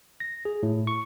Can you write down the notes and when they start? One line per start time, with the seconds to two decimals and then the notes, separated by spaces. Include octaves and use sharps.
0.20 A#6
0.45 G#4
0.63 A2
0.87 C#6